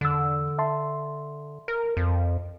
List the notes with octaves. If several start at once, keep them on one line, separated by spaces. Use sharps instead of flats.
E2 D3 E6
E5 A5 C6
A#4
F2